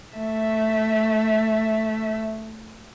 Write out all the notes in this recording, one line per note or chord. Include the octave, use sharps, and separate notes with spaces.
A3 E5